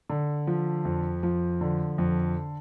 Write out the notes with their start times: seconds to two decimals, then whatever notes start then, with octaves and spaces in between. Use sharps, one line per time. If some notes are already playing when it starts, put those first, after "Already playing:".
0.10 D3
0.47 F3
0.85 F2
1.23 F3
1.61 D3
1.98 F2